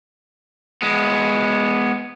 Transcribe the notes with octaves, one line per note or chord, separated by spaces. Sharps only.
G#3 B3